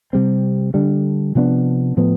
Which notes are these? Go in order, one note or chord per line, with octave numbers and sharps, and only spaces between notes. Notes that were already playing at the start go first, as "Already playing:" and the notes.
C3 G3 C4
D3 G3 D4
C3 F3 B3 D4
A2 F3 B3